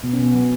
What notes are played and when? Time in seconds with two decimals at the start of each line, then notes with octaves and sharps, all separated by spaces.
0.03 B2 B3
0.13 C#4
0.19 B2 B3
0.34 F#3